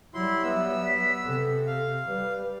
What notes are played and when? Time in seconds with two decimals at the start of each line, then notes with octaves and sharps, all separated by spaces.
0.14 F#3 G3 E4 C6
0.43 B3 E5 E6
0.86 B6
1.25 C3 A4
1.67 F5
2.08 G3 B4